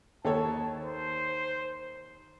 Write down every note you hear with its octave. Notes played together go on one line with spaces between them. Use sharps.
D#2 A4 C#5 A5
C5